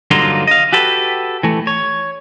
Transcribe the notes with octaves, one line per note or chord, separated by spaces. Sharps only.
G2 D3 F#3 A#3 D#4 F4
D#5 F5
F#4 G4 A4 B4
E3 A3
C#5